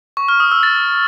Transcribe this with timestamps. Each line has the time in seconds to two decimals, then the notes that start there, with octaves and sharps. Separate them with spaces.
0.17 C#6
0.29 F6
0.40 D#6
0.52 E6
0.63 A6